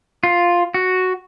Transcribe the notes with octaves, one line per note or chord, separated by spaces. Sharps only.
F4
F#4